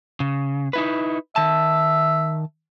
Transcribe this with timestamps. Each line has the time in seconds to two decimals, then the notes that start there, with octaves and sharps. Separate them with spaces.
0.20 C#3
0.73 D#4 E4 B4
1.36 D#3 E5 A5